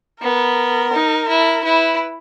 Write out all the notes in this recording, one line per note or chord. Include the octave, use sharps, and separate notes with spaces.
B3 A#4
D#4
E4
E4 B4